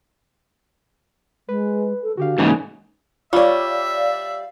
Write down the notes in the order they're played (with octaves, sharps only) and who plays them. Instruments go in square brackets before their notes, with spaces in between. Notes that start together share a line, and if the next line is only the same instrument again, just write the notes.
[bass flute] G#3 [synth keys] B4
[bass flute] A4
[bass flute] D3 [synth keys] F#4 G4 F5
[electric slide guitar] G#2 C#3 [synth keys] E3 A#3 [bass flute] D#4
[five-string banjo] G3 C#5 [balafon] F4 [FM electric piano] D5 F5 [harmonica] E5